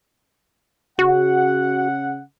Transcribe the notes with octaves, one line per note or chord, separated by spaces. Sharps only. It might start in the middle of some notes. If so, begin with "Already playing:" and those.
C#3 F#4 F#5